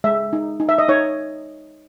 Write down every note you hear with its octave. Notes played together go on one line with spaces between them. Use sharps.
G#3 E5
D#4
D#4
E5
D#5
D#4 C#5